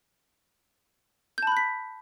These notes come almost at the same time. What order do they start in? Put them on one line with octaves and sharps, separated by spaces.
G6 A5 B5 F#6 B6